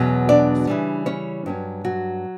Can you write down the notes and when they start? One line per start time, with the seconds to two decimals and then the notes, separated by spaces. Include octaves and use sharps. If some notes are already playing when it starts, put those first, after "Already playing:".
Already playing: E2 B2 F#3 C#4 F#4
0.29 D4 D5
0.67 C#3 E3 G3
1.06 C#4 C#5
1.46 G2 F#3 C#4
1.85 F#3 F#4